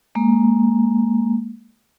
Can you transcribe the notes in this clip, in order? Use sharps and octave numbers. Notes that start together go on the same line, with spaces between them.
G#3 A#3